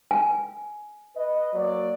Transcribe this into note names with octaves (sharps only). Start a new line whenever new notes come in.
G#5
B4 D#5
F#3 A#3 D5